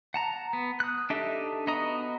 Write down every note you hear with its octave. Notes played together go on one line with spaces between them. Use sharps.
F#5 A5 A#5
B3
D#6 F#6
D4 D#4 G4 A4 E5
B3 F#4 D#5 A#5 D#6